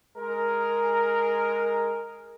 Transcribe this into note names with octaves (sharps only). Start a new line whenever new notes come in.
G#3 A#4